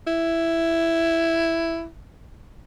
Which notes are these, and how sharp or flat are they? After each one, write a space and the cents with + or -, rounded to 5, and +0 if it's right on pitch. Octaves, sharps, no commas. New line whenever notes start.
E4 +5